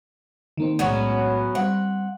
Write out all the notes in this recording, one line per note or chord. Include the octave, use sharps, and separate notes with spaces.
D#3 A#3 C4
B1 A2 F#3 G#3 B3 C#4
G3 C4 F#5